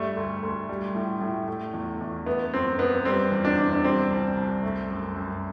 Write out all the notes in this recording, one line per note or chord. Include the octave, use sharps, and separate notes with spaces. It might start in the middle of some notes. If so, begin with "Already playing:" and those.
Already playing: G2 G3 A3
D2
D2
G3
A2
A2
A3
E2
E2
A3 B3
F#2 C4
F#2 B3
G3 C4
E2
D4
E2
D4
G3 C4
C2
C2
A3
F#2
F#2